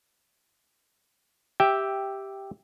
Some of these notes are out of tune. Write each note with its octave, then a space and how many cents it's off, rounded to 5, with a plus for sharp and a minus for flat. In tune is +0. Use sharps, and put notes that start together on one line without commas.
G4 +0 E5 +0 G5 +5